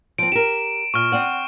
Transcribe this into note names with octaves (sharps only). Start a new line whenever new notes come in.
F3 C4 D7
G4 A#4 E7
A#2 C#6 F6
C4 D5 F#5